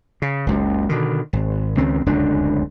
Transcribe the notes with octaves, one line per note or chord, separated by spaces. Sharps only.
C#3
F#1 C#2 F#2
B2 D3 D#3
G#1
C#2 D#3 C4 C#4
D1 C#2 F#2 D4